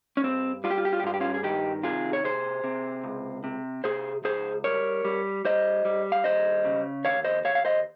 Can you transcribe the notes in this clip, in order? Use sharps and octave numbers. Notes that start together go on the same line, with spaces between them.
C#4
G2 C4
G3 F4
G4
F4
G4
F4
G4
G2 F4
G4
C#4 F4
G#4
D#3 D#4 G4
C3 F4 G#4
C#5
C3 G#4 C5
C3
C#2
C3
C3 G#4 C5
C#2 G#4 C5
G3 A#4 C#5
G3
G3 C5 D#5
G3
F5
D#2 C5 D#5
C#3
D#2 C#5 F5
C5 D#5
D#2 C#5 F5
F5
C5 D#5